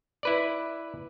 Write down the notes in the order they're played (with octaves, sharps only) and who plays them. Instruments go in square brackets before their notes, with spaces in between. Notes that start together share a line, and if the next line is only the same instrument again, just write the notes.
[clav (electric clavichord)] E4 B4 D5